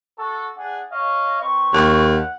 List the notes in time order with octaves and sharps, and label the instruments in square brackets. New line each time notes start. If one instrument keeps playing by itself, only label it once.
[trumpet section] F#4 A4
D4 G#4 F#5
C#5 D#5 F5
C4 B4 C#6
[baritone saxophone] D#2
[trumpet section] F#5